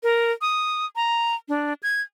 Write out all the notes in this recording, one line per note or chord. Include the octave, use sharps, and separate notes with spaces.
A#4
D#6
A#5
D4
G#6